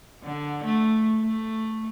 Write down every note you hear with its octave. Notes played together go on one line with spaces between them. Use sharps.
D3
A3
A3